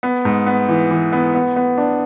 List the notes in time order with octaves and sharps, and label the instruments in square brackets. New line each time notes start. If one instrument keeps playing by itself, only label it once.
[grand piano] B3
G#2
B3
E3
E3
B3
B3
B3
D4